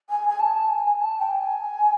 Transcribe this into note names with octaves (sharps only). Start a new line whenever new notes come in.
G#5
G#5
A5
G#5
A5
G5
G#5